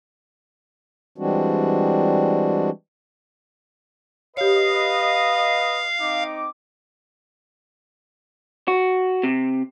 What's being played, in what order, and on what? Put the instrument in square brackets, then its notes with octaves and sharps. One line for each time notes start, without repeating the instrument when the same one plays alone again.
[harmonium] E3 G3 G#3 C4 D4 F#4
[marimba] G4 C#5 [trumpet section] B4 D#5 [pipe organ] F5
[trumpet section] C4 D#4 D6
[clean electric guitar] F#4
C3